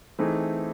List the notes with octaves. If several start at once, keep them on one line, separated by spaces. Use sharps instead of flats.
E3 A3 C4 D#4 G#4